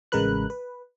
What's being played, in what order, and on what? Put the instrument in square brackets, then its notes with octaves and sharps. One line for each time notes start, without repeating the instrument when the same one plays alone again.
[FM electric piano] A1 C#3 G#3 A#4 B4 F#6
B4